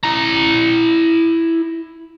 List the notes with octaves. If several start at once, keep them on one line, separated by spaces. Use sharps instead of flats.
E4 A#5